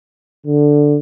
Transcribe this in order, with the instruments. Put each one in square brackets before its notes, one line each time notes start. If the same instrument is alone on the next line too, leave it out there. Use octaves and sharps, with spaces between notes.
[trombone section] D3